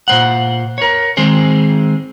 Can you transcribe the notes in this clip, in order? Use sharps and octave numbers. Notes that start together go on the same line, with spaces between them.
A#2 C5 F#5
A#4 C#5
D#3 G#3 C4 G#4 C5